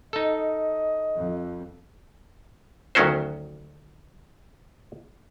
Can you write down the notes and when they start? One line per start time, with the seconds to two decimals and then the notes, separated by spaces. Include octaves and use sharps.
0.13 D#4 A4 D#5
1.16 F2
2.95 D2 D#3 F#3 C#4 F#4 C5